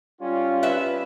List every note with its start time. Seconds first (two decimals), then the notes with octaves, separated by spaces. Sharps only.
0.20 G3 C#4 F4
0.63 B4 E5